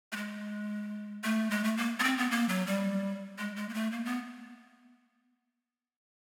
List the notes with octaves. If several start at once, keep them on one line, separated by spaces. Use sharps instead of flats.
A3
G#3
A3
G#3
A3
A#3
B3
C4
B3
A#3
F#3
G3
G#3
G#3
A#3
A3
A#3
B3